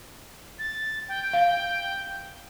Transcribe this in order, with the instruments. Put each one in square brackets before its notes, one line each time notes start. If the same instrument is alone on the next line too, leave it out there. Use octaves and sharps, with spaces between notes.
[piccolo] A6
G5
[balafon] F5